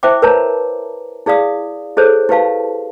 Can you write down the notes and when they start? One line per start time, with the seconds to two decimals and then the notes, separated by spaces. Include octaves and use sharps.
0.03 E4 C5 E5 G5 D6
0.22 A#4 B4 C#5 A5 A#5
1.26 E4 G#4 D5 F5 D#6
1.97 E4 G#4 A4 C5 C#5
2.29 E4 G4 B4 F5 A5